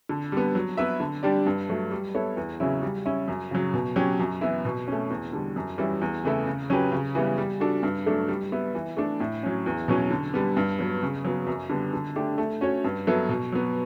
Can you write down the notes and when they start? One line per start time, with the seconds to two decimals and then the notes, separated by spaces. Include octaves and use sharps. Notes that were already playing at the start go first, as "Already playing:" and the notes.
0.09 D3
0.32 G3 B3
0.55 F#3
0.77 B3 E4 B4 E5
1.00 D3
1.23 G3 D4 G4 D5
1.46 G2
1.69 F#3 A3
1.91 G3
2.15 B3 E4 A4 C#5
2.37 E2
2.60 C#3 F#3 C#4 E4
2.82 G3
3.06 C#4 E4
3.28 F#2
3.51 C#3 F#3
3.74 B2
3.96 F#3 C#4 G4
4.20 F#2
4.41 E3 B3 E4
4.65 B2
4.88 A3 C#4
5.10 E2
5.33 D3 G3
5.56 F#2
5.78 E3 G3 C#4 E4
6.01 E2
6.24 C#3 E3 A3 E4
6.47 C#3
6.70 F#3 C#4 G4 B4
6.92 C#3
7.15 E3 G3 B3
7.38 G3
7.60 D4 F#4 A4
7.83 G2
8.06 F#3 A3 D4 A4
8.28 G3
8.52 B3 E4
8.75 E3
8.97 A3 D4 A4
9.20 A2
9.43 F#3 C#4
9.66 E2
9.88 B2 F#3 C#4
10.11 D3
10.34 G3 B3
10.57 G2
10.79 F#3 B3
11.03 C#3
11.25 F#3 B3
11.47 F#2
11.70 D3 G3 B3
11.93 D3
12.16 A3 D4 G4
12.38 A3
12.61 C#4 F#4 C#5
12.84 G2
13.07 F#3 B3 E4 A4
13.29 B2
13.52 F#3 B3